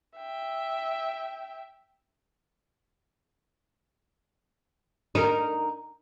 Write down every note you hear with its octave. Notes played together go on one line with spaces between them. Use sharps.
E5 G5
D#4 A#4